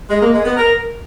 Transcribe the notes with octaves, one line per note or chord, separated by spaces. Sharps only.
G#3
A#3
G#3
B3
A#4